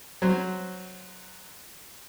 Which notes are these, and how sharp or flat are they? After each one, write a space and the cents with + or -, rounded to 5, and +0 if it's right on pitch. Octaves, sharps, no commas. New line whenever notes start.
F#3 +0 C5 +0